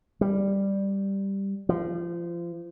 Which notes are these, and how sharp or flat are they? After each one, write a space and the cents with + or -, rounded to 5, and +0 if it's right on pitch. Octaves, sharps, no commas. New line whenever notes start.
G3 +5
F3 -30